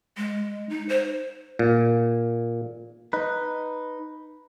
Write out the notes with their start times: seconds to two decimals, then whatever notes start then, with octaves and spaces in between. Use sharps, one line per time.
0.17 G#3
0.69 D#4
0.89 C5
1.59 A#2
3.13 D#4 B4